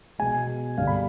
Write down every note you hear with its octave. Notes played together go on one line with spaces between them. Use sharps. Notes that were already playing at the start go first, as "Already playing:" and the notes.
B2 G#3 G#5
G2 D3 G3 F5
B5